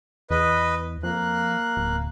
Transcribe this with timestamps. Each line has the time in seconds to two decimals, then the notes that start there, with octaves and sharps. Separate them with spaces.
0.30 E2 B4 D#5
1.03 F2 A#3 F#6
1.77 D1